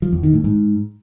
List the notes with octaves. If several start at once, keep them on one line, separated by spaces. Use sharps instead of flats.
F3
E2
D#3
A2
G#2